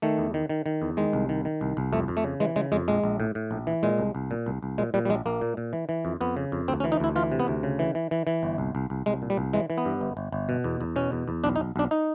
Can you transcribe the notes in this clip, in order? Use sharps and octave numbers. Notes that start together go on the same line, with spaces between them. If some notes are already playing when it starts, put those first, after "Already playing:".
D#3 A3
E2
D#3
D#3
D#3
E2
D#3 G#3
C2
D#3
D#3
C2
C2
F2 A3
F2
A3
C#3
E3 G#3
C#3 G#3
F2 G#3
A#1 G#3
A#1
A2
A2
A#1
E3
A#2 G#3
C2
C2
A#2
C2
C2
A#2 G#3
A#2 G3
G3
A#1 G#3
A#1 A#3
A#2
A#2
E3
E3
F2
F2 B3
C#3
F2
D2 C4
C#4
E3
D#4
D2 E4
E3 F4
C3
B3
D2
C#3
E3
E3
E3
E3
G1
C2
C2
C2
C2 G#3
A#2
G3
C2
E3 G#3
E3
B3
G2
G1
G1
G1
B2
E2
E2
B2 C#4
E2
E2
B1 D4
D#4
B1
B1 D4
D#4